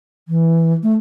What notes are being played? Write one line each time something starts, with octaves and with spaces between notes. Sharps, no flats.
E3
A3